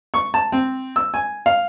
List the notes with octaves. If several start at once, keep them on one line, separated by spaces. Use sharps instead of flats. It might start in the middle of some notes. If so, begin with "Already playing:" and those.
C#6
A5
C4
E6
G#5
F5